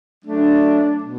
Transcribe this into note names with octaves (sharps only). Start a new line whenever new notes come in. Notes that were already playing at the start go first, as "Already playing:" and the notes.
F#3 A3 D4
B2